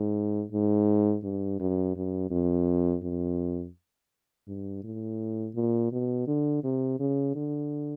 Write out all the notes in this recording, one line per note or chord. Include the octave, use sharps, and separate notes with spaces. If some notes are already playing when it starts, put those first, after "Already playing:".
Already playing: G#2
G#2
G2
F#2
F#2
F2
F2
G2
A2
A#2
B2
D3
C3
C#3
D3